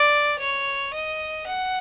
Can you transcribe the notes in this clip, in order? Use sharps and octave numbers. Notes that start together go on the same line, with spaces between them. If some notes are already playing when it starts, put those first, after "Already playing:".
Already playing: D5
C#5
D#5
F#5